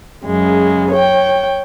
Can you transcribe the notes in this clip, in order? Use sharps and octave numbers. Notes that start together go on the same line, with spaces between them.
F#2 C#3 G#3
C#5 G5